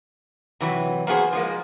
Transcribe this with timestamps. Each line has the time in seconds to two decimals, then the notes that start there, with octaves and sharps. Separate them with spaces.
0.60 C3 E3 F#3
1.07 A#3 B3 F#4 G#4 C5
1.33 F3 G#3 A#3